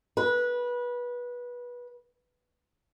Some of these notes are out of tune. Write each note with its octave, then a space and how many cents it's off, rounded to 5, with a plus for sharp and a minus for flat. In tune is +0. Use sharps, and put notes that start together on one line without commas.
B4 -20